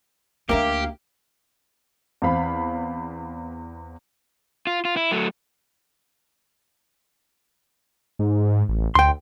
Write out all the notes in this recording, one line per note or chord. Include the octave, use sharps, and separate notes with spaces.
D2 A#3 D4 G4 A#4 E5 F5
E2 C4 F5 B5
F4
F4
E4
F#3 A3
G#2
A1
D2 G5 C6